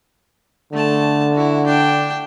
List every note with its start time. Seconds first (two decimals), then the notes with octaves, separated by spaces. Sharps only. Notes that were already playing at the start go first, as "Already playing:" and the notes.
0.73 D3 A3 A5
1.33 E4 F#4
1.66 D4 G5